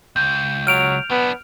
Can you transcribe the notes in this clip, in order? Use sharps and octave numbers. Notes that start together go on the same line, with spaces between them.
C#2 G6
F#3 F6 D7 F7
F#3 B3 D4